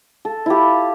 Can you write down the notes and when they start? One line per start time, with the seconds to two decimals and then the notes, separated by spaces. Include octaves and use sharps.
0.25 A4
0.46 E4 F4 G4